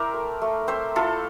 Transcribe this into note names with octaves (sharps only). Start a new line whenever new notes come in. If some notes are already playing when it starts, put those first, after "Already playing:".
Already playing: C4 E4 A#4 C5 D5 E5 G5
A3
A3
C4 C5 E5
E4 F4 A4